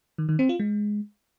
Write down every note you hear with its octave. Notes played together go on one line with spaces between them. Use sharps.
D#3
D#3
C4
F4
G#3